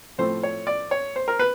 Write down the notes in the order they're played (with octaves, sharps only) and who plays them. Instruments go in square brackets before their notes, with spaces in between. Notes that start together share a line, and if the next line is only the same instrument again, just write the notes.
[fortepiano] A2 F3 A3 C4 C5
C#5
D5
C#5
C5
A#4
B4